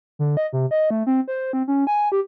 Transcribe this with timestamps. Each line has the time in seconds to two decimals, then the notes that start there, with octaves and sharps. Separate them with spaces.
0.19 D3
0.37 D#5
0.53 C3
0.71 D#5
0.91 A3
1.07 C4
1.28 C5
1.53 C4
1.68 C#4
1.87 G#5
2.12 G4